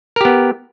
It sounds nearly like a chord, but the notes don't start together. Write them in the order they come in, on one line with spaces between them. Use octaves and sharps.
A#4 G4 B3